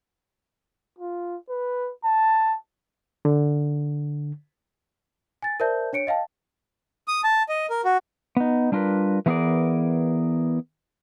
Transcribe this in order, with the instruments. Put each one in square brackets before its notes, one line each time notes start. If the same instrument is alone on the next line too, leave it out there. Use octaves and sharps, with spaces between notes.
[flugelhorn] F4
B4
A5
[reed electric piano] D3
[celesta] G#5 A6
A#4 C5 D5 E5 A5 G6
D4 C#5 C#7 D7
D#5 F5 G5 A5
[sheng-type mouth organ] D#6
A5
D#5
A#4
F#4
[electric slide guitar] B3 D#4
G3 D4 F4 A#4 B4
E3 A3 B3 G#4 A#4 D5